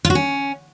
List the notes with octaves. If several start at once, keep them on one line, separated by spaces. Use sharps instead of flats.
F4
F#4
C#4